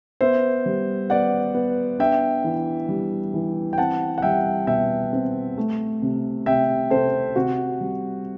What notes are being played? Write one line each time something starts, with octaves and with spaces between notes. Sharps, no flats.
B3 C5 E5
G3
B3 D5 F#5
B3
D4 E5 G5
E3
G3
E3
G5
C4 F#5 A5
F#5
G3 E5 G5
B2 E5 G5
C4
A3
C3
C3 E5 G5
C3 A4 C5
C3 F#4
G3